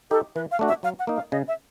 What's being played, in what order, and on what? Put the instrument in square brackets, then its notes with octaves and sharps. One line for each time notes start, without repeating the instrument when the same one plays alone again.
[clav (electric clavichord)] D#4 G4 [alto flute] A4
[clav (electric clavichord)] E3 [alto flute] B4
[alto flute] F5
[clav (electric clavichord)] A3 D4 F#4
[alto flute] E5
[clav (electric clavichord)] F#3 [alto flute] F5
[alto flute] F#5
[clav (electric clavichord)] A#3 D#4
[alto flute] F5
[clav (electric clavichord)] C#3 [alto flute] D#5
[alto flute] E5